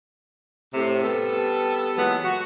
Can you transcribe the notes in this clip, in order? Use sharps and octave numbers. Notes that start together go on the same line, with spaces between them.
A2 C3
G3 B3 A4
A#2 E3 F#3 G#3 B3
F#4